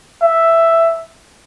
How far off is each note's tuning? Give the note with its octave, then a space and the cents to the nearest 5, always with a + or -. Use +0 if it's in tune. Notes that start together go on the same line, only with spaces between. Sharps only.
E5 +5